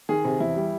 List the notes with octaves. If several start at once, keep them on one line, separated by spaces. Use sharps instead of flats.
D#3 G#4
C3
E2 E4
G3